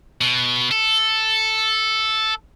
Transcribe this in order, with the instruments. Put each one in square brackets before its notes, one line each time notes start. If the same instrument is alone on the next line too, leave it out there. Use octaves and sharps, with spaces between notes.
[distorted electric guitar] B2
A4